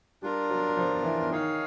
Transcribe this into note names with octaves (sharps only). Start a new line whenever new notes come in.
G3 D4 F4 A#4
F#3
F3
E3
D#3 D#4 G#4 C#5 F5